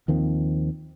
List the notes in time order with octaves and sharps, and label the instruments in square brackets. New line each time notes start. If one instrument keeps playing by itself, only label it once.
[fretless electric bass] D#2 D#3 F3 C4